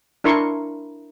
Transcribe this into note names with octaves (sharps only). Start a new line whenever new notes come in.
D4 E4 A#4 C6 C#6